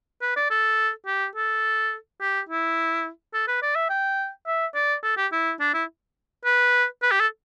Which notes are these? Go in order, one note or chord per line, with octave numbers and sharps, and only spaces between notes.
B4
D5
A4
G4
A4
G4
E4
A4
B4
D5
E5
G5
E5
D5
A4
G4
E4
D4
E4
B4
B4
G4
A4